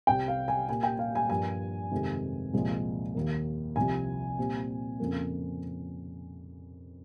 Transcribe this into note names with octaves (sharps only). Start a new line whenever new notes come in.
C2 C3 G3 C4 G5
F5
G#5
A#2 G3 A#3 G#5
G5
F5
G#5
G2 F3 A#3 G#5
F2 C3 D#3 G#3 C4
C2 A#2 F3 G#3
D#2 D#3 A#3
C2 C3 F3 G#5
A#2 G3 C4
F2 C#3 F3 A#3